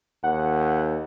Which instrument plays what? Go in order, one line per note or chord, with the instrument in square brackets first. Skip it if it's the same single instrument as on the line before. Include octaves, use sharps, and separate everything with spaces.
[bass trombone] D#2 [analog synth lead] F#5